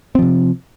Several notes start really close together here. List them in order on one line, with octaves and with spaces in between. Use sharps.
C4 F3 C3